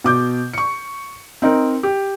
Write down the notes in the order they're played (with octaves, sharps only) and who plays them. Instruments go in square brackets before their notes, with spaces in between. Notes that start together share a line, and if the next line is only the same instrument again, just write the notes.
[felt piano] B2 D6 G6
C#6 C#7
C4 D#4 A#4
G4